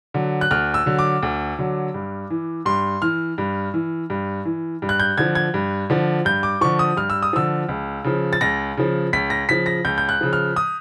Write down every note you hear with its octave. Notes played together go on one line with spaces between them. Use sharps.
D3 F#3
F#6
D2 F6
E6
D3 F#3
D6
D2
D3 F#3
G2
E3
G2 C6
E3 F6
G2
E3
G2
E3
G2
F#6
G6
D3 F3 G#6
G#6
G2
D3 F3
G2 G6
D6
D3 F3 C#6
D#6
G2 F6
E6
D#6
D3 F3 E6
C#2
C#3 F3
A6
C#2 A#6
C#3 F3
C#2 B6
A#6
C#3 F3 B6
A#6
C#2 G6
G6
F#6
C#3 F3
F6
D#6